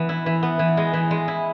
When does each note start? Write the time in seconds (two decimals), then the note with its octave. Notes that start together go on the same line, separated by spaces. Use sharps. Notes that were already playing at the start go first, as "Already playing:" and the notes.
Already playing: E3 B3
0.09 E4
0.26 E3
0.43 B3
0.59 E3
0.77 G#3
0.93 E3
1.11 G#3
1.28 E4